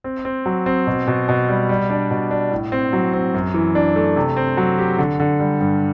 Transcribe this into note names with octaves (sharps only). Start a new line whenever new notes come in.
C4
C4
F#3
C4
B2
B2
B2
G3
G3
D4
B2
D4
A2
C4
F#3
C4
F#2
E3
D4
A3
C3
C4
F#3
G4
D3
D3
G3
G2